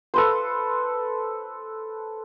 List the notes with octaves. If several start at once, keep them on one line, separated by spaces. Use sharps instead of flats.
A4 B4 C5